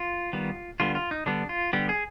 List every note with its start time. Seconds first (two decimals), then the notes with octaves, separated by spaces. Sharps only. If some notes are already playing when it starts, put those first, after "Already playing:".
Already playing: F4
0.33 D#3 G3 B3
0.80 D3 G3 B3 F4
0.95 F4
1.11 D#4
1.26 D3 G3 B3 D4
1.49 F4
1.73 D3 G3 B3 G4
1.89 G#4